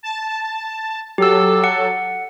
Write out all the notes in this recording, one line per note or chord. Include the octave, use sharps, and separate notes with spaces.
A5
F#3 G4 A4 E6
F#5